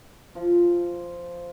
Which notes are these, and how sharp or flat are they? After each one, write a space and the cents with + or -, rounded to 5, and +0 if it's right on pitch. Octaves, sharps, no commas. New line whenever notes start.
F3 -5